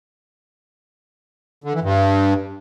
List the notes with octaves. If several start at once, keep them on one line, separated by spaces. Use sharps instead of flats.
D3
E3
G2